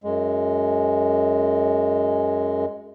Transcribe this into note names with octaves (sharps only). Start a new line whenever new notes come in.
F#2 G#3